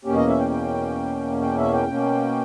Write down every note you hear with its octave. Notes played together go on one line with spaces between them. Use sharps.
E2 B2 A#3 C#4 G4
D#5
E5
G5
G5
G5
E5
G5
B2 A#3 C#4